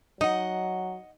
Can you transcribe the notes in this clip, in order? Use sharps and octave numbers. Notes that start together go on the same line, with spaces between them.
F#3 D#4 D#5 F#5